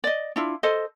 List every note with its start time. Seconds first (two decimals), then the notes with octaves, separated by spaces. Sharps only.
0.04 D5 D#5
0.36 D4 E4 F4
0.63 A4 C5 D#5